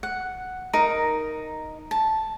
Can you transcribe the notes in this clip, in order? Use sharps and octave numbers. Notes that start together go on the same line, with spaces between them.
F#5
D#4 A#4 A#5
A5